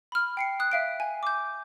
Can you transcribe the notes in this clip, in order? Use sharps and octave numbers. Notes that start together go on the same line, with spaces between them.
B5 F6
G5 C7 C#7
D#6 F#6
E5 F5 D7
G#5
D6 G6